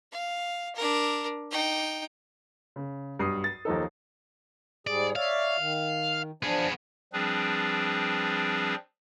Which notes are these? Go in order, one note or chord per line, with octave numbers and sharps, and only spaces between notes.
F5
D4 A#4
D#4 G5
C#3
B1 G2 D#6 C7
A6
D#2 F3 D#4 A4
G#2 G3 G#4 D5
C#5 D5 E5 F5
D#3
F3 B3 D4 G#4
F3 G3 C4 D4 G#4 B4